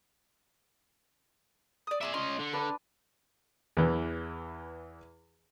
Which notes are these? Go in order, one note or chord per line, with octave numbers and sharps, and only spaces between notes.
D5 D#6
G#4 E5 G#5 A#5 D6
C#4 D#5 C6
D3
D4 B4
E2 E3